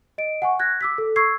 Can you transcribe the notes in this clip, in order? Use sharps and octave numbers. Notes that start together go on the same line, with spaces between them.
D#5 D7
F#5 G#5 C#6
F#6 G#6 A#6
D6 E6 B6
A4
C#6 E6 G#6 C7